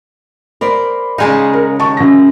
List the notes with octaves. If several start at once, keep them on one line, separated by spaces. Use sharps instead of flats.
A#4 C5 D5 B5
C#3 G#3 D#4 G#4 D5 F5
A#4
D#3 A5 C#6
F#2 A#6